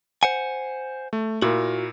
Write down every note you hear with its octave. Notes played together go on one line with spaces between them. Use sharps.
C5 F#5 G#5
A3
A#2 E4 F#4 A#4